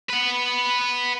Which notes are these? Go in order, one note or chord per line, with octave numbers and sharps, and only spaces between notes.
B4 F#5